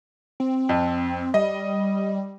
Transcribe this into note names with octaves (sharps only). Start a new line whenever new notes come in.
C4
F2
G3 D#5